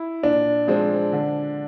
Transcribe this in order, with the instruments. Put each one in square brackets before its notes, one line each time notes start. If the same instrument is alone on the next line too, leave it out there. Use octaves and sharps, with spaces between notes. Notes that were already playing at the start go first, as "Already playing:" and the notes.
Already playing: [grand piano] E4
[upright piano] A#2 [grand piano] D4
[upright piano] F3 G#3 C4
D3